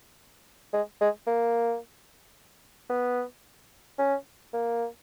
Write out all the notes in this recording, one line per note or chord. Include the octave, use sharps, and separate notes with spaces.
G#3
G#3
A#3
B3
C#4
A#3